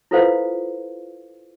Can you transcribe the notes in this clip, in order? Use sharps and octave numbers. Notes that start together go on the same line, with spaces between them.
E4 F4 A4 B4 C5 F5